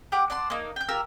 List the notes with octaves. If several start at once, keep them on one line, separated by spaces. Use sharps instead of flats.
G4 F#5 D6
D5 F#5 A5 C6
A#3 D#4
G5 G6
F4 G4 A#4 E6